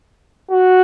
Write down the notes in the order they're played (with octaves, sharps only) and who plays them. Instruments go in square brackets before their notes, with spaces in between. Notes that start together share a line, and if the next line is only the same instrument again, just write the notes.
[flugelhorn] F#4